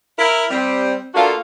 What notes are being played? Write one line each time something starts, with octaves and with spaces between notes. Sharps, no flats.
E4 A#4
G3 C4
A3 A#3 D4 F4 F#4 A4